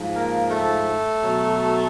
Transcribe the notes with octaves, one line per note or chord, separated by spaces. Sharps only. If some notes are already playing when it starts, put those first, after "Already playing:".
Already playing: G#2 F3
A#3 A#4
A3 A4
B2 F#3